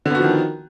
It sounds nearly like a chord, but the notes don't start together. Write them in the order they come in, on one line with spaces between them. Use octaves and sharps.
D3 B3 F#4 F3 D#3